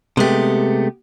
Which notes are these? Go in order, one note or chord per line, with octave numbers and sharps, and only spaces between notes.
C3 G#3 A3 B3 G4